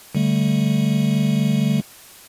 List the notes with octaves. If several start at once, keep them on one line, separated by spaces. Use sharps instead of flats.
D3 G3 A3